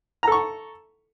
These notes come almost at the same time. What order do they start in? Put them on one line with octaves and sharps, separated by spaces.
A#5 A4 C#6